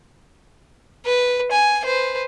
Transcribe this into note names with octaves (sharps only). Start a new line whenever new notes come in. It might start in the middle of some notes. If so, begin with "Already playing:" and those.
B4
G#5
B4 C5